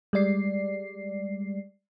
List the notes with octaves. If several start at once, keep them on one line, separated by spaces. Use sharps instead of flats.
G3 G#3 D5 C7